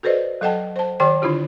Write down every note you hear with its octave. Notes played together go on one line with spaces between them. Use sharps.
F#4 A4 B4 C5 D5 D#5
F#3 A4 D#5 F#5 G5 A5
C5 A5
D#3 G4 D5 G5 D6
D3 D4 E4 F4 G4